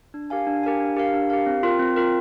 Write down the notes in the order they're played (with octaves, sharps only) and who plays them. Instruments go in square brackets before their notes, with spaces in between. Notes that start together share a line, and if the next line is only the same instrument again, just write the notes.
[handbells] D4
G4 A#4 F5 G#5
D4
G4 A#4 F5 G#5
D4
G4 A#4 F5
D4
G4 A#4 F5
C4
F4 A#4
C4
F4 A#4